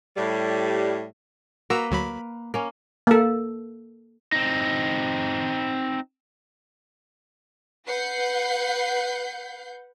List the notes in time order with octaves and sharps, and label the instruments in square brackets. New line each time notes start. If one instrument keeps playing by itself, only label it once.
[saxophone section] A2 G3
[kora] A#3 B4 [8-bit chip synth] F#4 A#5 E6
[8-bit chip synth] D2 F#3 B5
[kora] A#3 C#4
[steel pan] A#3 A4
[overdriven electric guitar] C4 D#4
[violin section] B4 F#5 G6 C7